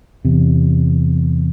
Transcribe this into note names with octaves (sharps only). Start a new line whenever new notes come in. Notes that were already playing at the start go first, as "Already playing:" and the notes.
E2 C3